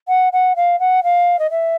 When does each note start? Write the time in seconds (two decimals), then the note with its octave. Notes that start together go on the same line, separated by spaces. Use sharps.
0.08 F#5
0.33 F#5
0.56 F5
0.80 F#5
1.04 F5
1.39 D#5
1.51 E5